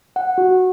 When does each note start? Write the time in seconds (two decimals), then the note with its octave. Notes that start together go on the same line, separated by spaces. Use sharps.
0.16 F#5
0.38 F#4